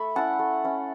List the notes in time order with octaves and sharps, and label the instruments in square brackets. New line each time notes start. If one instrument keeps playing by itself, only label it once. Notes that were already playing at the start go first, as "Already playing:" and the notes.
Already playing: [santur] A3 E5 B5
C#4 E4 F#5 A5
A3
C#4 E4